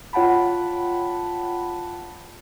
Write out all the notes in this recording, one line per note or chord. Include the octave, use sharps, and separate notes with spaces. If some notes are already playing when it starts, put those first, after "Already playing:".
F4 C#5 F#5 G5 A5 B5